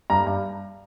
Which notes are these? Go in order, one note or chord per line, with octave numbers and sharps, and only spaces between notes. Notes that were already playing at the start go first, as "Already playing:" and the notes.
G2 A#5
G2